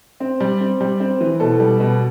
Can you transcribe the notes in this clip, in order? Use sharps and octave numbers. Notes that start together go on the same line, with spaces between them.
C4
G3
C4
G3
C4
E3
B2 A4
G3
B2